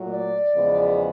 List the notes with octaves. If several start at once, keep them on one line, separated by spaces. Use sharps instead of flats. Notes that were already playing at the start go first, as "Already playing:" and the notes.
Already playing: A#2 F#3 A3
D5
E2 C#3 F3 G#3 B3